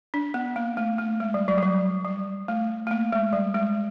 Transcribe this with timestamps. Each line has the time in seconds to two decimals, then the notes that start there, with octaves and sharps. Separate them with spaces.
0.14 D4
0.34 B3
0.56 A#3
0.77 A3
0.98 A3
1.20 G#3
1.34 G3
1.48 F#3
1.58 G3
1.63 F#3
2.05 G3
2.48 A3
2.87 A3
2.91 A#3
3.12 G#3
3.33 G3
3.55 G#3